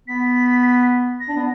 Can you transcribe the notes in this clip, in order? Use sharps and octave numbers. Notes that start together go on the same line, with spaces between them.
B3 B6
A#6
D4
B3